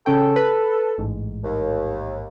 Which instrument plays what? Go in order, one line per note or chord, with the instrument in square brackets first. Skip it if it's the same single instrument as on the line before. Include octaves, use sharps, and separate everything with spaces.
[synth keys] C#3 C#4 G5 [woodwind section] A4
[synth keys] B4
A1 G#2
[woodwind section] D#2